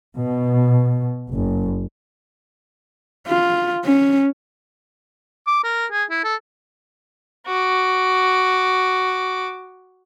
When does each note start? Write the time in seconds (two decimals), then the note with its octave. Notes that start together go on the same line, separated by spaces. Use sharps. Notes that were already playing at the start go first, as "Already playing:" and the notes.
0.17 B2
1.32 F#1
3.27 F4
3.84 C#4
5.47 D6
5.64 A#4
5.92 G#4
6.11 E4
6.24 A4
7.47 F#4 D6